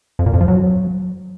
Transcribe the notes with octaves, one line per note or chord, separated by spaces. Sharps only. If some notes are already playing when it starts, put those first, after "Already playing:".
F2
A#2
F2
F3
F#3